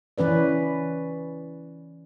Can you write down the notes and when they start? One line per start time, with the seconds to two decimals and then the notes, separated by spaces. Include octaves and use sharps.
0.18 E3 C#4 B4 D5